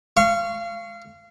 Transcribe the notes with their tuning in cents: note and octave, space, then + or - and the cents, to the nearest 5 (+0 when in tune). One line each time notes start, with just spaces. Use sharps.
F5 -30 C#6 +0